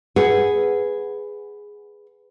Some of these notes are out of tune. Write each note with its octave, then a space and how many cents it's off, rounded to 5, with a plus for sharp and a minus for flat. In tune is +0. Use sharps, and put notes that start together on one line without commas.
G#4 +0 B4 +5 F#5 +0